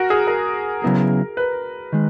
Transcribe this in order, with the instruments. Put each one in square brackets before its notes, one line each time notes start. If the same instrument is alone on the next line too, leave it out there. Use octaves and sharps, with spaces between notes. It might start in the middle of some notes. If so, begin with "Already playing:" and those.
Already playing: [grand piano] F#4 A#4
G#4
A#4
[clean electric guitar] C#3 F#3 B3 E4 G#4
[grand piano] B4
[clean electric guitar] D#3 G#3